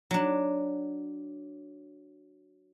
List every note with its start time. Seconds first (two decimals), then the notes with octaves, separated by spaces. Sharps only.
0.11 F#3 D4